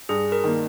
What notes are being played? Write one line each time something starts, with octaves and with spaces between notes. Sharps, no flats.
G2 G#4
A#4
D#3 A#3